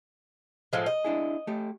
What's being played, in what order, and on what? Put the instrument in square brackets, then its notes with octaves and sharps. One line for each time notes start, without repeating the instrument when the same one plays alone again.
[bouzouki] A2 F3 G#3
D#5
[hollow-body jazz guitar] D4 E4 G#4
A3 G4